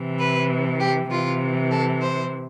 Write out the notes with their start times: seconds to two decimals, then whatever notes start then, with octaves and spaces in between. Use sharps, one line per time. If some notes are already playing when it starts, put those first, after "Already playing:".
Already playing: C3 E3
0.19 B4
0.80 G4
1.11 C3 E3 F4
1.72 A4
2.02 C5